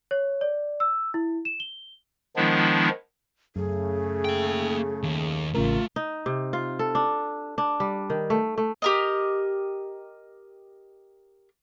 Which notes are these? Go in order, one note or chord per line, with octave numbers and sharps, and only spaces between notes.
C#5
D5
E6
E4
E7
G7
D#3 F3 G#3 B3 D4 E4
F#2 C#3 A3 G#4
A#3 G5
D#2
A1 C#3 A3 A#3 F4 A#4
D#4
C3
F4
A4
D4
D4
G3
D#3
A3
A3
G4 A#4 D#5